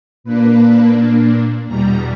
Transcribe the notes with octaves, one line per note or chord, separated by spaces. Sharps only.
A#2 A#3 D4 B4
E2 B2 G3 A#5